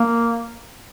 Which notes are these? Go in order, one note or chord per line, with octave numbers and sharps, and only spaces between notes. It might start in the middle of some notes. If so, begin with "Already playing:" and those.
Already playing: A#3